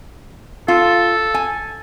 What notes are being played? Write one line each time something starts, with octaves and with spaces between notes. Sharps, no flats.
F4 A4
G#5